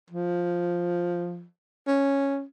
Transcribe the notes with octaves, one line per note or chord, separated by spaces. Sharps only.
F3
C#4